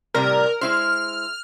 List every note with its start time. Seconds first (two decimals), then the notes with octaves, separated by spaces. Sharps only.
0.14 A2 C3 G3 A#4
0.61 G#3 E4 C5 F6